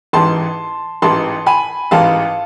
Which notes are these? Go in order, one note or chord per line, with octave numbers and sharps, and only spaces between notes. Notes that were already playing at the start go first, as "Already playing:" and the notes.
A1 G#2 E3 A5 C6
A1 G#2 E3 A5 C6
G#5 B5
A1 G#2 E3 F5 A5